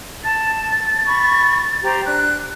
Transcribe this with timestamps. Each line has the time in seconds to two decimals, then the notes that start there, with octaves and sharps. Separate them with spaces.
0.24 A5 A6
1.07 B5 C#6
1.83 G4 C5 A#5
2.05 D4 F#6